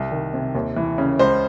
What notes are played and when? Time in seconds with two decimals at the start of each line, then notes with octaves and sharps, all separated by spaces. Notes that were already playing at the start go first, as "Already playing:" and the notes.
Already playing: C2
0.12 D#3
0.34 C3
0.55 D#2
0.76 E3
0.98 C#3
1.19 C#2 C5